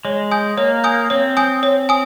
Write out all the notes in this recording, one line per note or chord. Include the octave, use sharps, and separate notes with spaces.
G#3 C#5
G#5 D#6 G6
A#3 C#5
G#5 D#6 G6
C4 C#5
G#5 D#6 G6
C#5
G#5 D#6